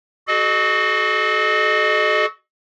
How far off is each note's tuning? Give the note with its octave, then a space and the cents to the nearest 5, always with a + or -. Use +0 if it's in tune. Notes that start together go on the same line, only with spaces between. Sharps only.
F#4 +15 A4 -40 D#5 -35